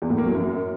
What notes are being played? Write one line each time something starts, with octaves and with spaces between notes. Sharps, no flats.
E2
A2
A#3
F#3
F#2